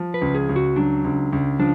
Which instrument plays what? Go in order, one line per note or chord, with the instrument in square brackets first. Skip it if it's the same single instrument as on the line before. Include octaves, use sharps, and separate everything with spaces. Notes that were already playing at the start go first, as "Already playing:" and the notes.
Already playing: [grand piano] F3
[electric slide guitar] B4
[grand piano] C#2
[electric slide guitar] G#4
[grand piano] C#2
[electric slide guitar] F#4
[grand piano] F#3 [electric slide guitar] D4
[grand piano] C#2
C#2
[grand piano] F3 [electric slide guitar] D4